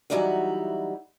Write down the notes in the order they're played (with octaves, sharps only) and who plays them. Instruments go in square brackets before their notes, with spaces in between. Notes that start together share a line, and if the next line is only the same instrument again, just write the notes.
[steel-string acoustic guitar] E3 F#3 G3 D#4 E4 F#4